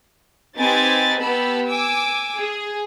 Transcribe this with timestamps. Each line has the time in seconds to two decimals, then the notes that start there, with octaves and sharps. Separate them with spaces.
0.58 C4 D#4 G4 B4 G#5 A6
1.22 B3 G4 A5 B5 E6
1.68 G#5 D6 E6
2.39 G#4